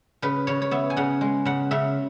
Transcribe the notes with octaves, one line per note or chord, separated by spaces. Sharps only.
C#3 B4
C#3 C#5
C#5
B3 E5
G#5
C#3 F#5
G#3
C#3 F#5
C#3 E5